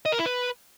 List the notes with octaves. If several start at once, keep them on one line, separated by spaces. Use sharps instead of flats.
D#5
A#4
E4
B4